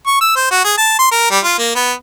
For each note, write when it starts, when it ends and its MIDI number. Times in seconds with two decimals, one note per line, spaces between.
0.07 0.18 85
0.21 0.35 88
0.36 0.50 72
0.51 0.62 66
0.64 0.74 68
0.77 0.95 81
0.99 1.10 84
1.11 1.26 70
1.31 1.39 55
1.44 1.55 65
1.58 1.70 58
1.75 1.92 59